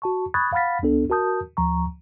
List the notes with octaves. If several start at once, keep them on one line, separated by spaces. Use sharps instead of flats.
F#4 A5 C#6
B5 C#6 D#6 F#6 G#6 A6
F5 F#5 B5 F6 A6 B6
C#2 B3 D4 A4
F#4 A#4 A5 D#6 G6
D2 F3 A#5 C#6